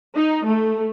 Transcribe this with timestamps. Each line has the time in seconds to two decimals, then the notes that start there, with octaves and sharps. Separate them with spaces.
0.16 D#4
0.45 A3